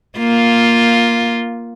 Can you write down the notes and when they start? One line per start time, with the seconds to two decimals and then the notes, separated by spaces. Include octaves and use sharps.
0.19 A#3 F4